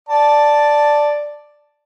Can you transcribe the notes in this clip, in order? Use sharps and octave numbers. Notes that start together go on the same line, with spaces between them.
D5 A5